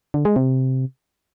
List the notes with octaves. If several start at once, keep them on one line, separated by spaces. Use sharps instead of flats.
D3
G#3
C3